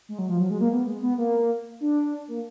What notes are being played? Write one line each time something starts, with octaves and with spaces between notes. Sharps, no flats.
G#3
F#3
F3
F#3
G#3
A#3
B3
G#3
B3
A#3
D4
A#3